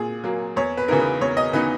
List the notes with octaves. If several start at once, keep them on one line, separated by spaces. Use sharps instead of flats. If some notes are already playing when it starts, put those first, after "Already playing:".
Already playing: A#2 G#4
F#3 A#3
E2 C#5
B4
C#3 E3 B3 D#4 A#4
B4
E2 C#5
D#5
C#3 E3 B3 D#4 B4